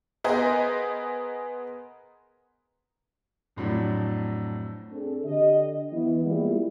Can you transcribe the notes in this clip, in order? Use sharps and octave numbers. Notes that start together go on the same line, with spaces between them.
B3 G#4 A#4 C5 D#5 G#5
F2 A2 F#3 D4
C4 D4 G#4 A4
D3 G4 D#5
E3 B3
G3 G#3 A#3 B3 E4 F4